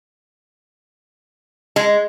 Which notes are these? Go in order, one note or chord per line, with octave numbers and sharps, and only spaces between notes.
G#3